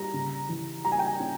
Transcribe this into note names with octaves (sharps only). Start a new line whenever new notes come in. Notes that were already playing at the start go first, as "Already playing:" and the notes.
Already playing: G3 A#5
C#3
E3
G3 A#5
G#5
G5
G#5
C#4